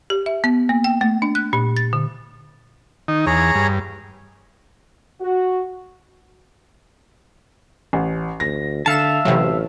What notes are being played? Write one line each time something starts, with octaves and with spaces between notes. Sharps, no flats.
G4
E5
B3
A#3
G5
A3
D4
F#6
A#2
A6
D3
D#3 D#4
E2 G#4 C#5 A#5
G2
F#4
A1
D2 A#6
D3 E5 F5 A5 C#7 E7
A1 C3 E3 F#3